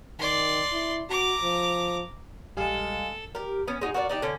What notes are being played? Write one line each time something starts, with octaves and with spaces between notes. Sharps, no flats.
D#3 D5 C6
E4
F#4 A#5 D6
F3
A#1 G3 G#3 G#4 A4 F5
G4 A#4
B3 C#4
G#3 D#4 F#4
F#4 A#4 B4 D5
D4 D#4 G4
D3 C#4